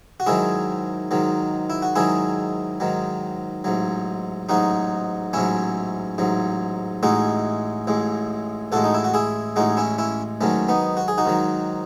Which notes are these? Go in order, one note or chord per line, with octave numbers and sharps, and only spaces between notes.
F#4
G#2 D#3 F#3 E4 G#4
G#2 D#3 F#3
E4
F#4
G#2 D#3 F#3 E4 G#4
G#2 D#3 F#3
A1 G#2 F#3
A1 G#2 F#3 D#4 F#4
A1 G#2 F#3 C#4 E4
A1 G#2 F#3
A1 A2 G#3 D#4 F#4
A1 A2 G#3
A1 A2 G#3 F#4 A4
D#4
E4
F#4
E4 G#4
A1 A2 G#3 D#4 F#4
C#4 E4
C#4 E4
G#2 D#3 F#3 A3 C#4
B3 D#4
F#4
G#4
D#4 F#4
G#2 D#3 F#3